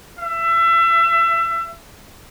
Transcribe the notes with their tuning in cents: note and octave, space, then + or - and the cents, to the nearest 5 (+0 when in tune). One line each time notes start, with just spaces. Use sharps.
E5 +30